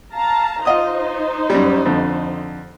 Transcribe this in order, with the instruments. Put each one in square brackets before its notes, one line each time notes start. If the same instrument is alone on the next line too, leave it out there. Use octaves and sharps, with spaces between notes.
[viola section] F5 A5 A#5
[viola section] D#4 C5 [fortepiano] F4 D#5 D#6
[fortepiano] F#2 G3
F2 D3